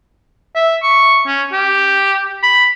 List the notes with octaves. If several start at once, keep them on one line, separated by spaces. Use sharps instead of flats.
E5
C#6
C#4
G4
B5